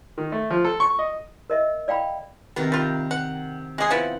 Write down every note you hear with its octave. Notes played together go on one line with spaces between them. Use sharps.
D#3
A3
F3
A4
C#6
D#5
A#4 D#5 E5
D5 F5 G5 A#5 B5
C3 D#3 B3 A#4
G3 F4
F#5
G#3 G#4 F#5 G#5
F3 B3 E4